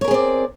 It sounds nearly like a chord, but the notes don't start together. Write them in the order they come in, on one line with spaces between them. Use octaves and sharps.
C#5 A#4 G#4 C4 D5